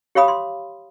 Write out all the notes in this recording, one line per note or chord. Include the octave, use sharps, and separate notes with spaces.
G4 C#5 F5 B5 D#6
C6